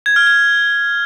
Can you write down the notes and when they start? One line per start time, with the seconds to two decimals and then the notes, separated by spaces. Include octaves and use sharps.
0.06 G#6
0.16 F6
0.27 G#6